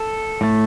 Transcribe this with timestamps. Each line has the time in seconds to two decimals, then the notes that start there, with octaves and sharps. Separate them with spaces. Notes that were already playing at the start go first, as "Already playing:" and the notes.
Already playing: A4
0.41 A2 A3